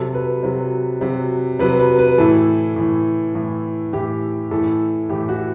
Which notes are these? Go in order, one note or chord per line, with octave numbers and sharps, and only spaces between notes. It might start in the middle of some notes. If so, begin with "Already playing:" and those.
Already playing: C3 F#3 A4
B4
C3 F#3
C3 F#3
C3 F#3 B4
B4
B4
A2 E3 A4
A2 E3
A2 E3
A2 E3 G4
A2 E3 A4
A2 E3 G4
F#4